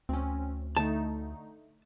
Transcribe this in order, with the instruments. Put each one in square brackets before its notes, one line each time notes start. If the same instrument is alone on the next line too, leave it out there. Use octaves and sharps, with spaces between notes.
[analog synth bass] D2 [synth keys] C4 C#4
[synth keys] D3 A3 D#4 [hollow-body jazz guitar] A5